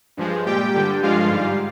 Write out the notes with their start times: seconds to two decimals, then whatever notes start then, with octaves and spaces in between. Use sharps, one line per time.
0.17 G2 F3 G#3
0.46 A#2 G3 G4 G5
0.74 G2 D3 G3
1.03 G2 D3 F3 G#3 F4 F5
1.31 G#2 G3